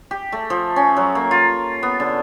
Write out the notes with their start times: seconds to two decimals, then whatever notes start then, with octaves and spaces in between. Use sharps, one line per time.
0.11 G4
0.32 A3
0.50 F3
0.76 C#4
0.97 F#3
1.15 A#3
1.31 F4
1.83 B3
2.00 D3